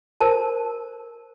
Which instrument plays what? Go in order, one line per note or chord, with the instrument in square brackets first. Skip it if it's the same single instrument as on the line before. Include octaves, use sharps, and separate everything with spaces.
[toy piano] A#4 C5 A5